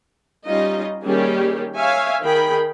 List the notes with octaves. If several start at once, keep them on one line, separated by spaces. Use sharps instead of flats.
G3 C#4 D#4 F4 D#5
D#3 G3 A#3 C#4 G4 G#4
C#5 E5 F5 G#5
D#3 G#4 A#4 G5 B5